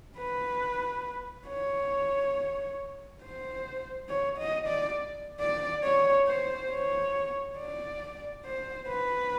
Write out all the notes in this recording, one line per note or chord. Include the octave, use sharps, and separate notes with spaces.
B4
C#5
C5
C#5
D#5
D5
D5
C#5
C5
C#5
D5
C5
B4